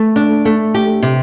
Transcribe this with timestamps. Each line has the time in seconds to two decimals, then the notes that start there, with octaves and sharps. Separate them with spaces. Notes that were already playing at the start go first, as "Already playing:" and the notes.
Already playing: A3
0.16 D4
0.45 A3
0.74 G4
1.03 C3